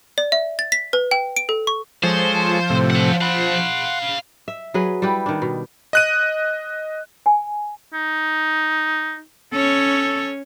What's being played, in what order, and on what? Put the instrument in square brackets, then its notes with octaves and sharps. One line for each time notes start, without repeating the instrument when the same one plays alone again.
[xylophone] D5
E5
A6
B6
B4
G5
D7
A4
C#6
[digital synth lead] F3 [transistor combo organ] G#3 A4 C#5 [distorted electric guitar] C5
[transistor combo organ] A2 C3
[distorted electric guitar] C5 F#5
[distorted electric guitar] F5 B5 [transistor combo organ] F#5 C6
[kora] E5
F#3 G#4 B4
G3 E4 G4 B4
D#3 D4
B2
[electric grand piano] D#5 F#6 D#7
[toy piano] G#5
[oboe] D#4
[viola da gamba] C#4 C#5 [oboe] A4